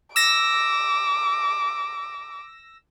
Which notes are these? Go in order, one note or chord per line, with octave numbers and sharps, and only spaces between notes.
D6 E6 A#6